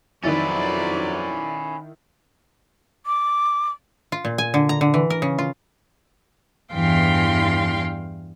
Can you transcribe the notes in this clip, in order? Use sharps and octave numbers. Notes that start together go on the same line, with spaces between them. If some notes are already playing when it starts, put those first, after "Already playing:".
F2 D#3 F#3 C#4 E4 B4 D5 A6
D6
F4
A#2
G#5
D3
A#5
D3
E3
A#4
C#3
F4
E2 G2 E3 F5 G5 C6